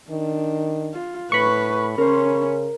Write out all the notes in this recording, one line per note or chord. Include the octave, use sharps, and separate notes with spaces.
D#3 D4
F4
A2 B4 B5 C#6
C#3 C#4 A#4 C5